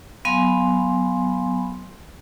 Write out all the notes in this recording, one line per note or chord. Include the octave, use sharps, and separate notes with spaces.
F#3 B3 F5 G#5 B5 C6